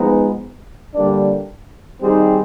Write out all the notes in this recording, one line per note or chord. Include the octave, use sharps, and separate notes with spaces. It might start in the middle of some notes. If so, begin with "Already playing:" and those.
Already playing: F3 G#3 B3 D#4
D3 G3 A#3 D4
D#3 G3 C4 D#4 G#4